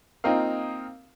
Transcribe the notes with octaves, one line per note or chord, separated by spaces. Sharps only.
A#3 C4 D#4 F4 A#4 F5